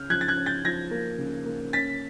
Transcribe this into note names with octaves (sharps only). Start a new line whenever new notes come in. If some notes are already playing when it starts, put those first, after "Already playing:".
Already playing: C#3 C#4 F6 G6
F3 F#6 G#6
A6
F#6 G#6
C#4
G6 A6
F3 G#6 A#6
A#3
C#3
A#3
C#4 A6 B6